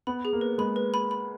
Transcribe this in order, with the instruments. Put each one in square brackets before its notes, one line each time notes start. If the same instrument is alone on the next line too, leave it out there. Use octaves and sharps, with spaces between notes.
[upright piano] B3 [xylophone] B5
[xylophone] G#4
[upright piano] A#3
[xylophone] B4
[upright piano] G#3 [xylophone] B5
[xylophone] B4
B5
B5